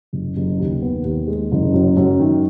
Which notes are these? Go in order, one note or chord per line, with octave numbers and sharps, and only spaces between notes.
F#1
F#1
D#2
B3
D#2
G#3
F#1
F#2
F#2
D#3